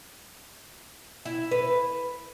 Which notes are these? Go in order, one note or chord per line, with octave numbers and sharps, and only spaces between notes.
E4
B4